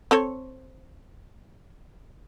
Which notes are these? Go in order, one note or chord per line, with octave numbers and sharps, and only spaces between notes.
C4 A4 C#5